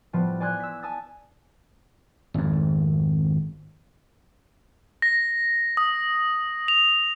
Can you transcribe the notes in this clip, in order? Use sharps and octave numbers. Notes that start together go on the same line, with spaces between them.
A2 F3 G3 B3
D5 G#5 C6 D#6 F#6 G#6
E6 B6
G#5 A5 D#6 E6 A6
G#1 F2
A#6
D#6
F7